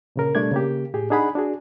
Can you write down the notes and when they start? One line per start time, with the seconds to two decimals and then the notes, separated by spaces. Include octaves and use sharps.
0.16 A#2 C#3 A#4
0.35 B2 G3 A3 D4 D5 G#6
0.51 C#3 A#3 G4
0.94 A2 G4 G#4
1.10 D4 D#4 G#4 F#5 B5
1.35 D4 F#4 G#4